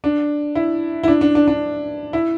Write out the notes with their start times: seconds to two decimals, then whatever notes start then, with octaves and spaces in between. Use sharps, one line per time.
0.04 D4
0.55 E4
1.03 E4
1.08 D4
1.21 D4
1.35 D4
1.48 D4
2.13 E4